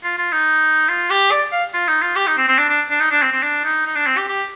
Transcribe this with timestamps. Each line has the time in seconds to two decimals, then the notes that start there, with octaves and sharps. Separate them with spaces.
0.04 F4
0.18 F4
0.32 D#4
0.89 F4
1.10 G4
1.31 D5
1.52 F5
1.74 F4
1.88 D#4
2.01 F4
2.16 G4
2.27 D#4
2.37 C4
2.48 C4
2.58 D4
2.69 D4
2.90 D4
3.00 D#4
3.11 D4
3.22 C4
3.32 C4
3.42 D4
3.64 D#4
3.86 D#4
3.96 D4
4.06 C4
4.17 G4
4.28 G4